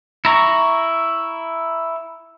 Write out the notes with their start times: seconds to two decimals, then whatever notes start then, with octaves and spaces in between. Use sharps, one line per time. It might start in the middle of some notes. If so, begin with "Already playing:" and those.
0.25 E4 A#5 C#6